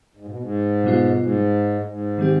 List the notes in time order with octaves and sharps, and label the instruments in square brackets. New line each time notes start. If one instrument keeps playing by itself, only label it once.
[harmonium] G#2
B2
G#2
[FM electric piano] B2 G3 B3 F4
[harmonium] G#2
G#2
[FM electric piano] D#3 G3 C4 G4